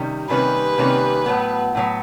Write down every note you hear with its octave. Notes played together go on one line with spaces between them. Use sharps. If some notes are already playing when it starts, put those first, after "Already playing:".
Already playing: C3 D#3 G3 C#4
C3 D#3 G3 A#3 C#4 B4
C3 D#3 G3 A#3 C#4
A2 F#3 B3
A2 F#3 B3